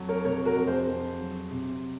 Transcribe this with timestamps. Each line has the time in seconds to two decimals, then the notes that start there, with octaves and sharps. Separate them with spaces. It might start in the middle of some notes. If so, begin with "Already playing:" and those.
Already playing: F2 F#3
0.09 A#4 C#5
0.25 C3 A#4 C#5
0.45 F#4 A#4
0.56 F2
0.67 G#4 C5
0.88 F2
1.19 F#3
1.51 C3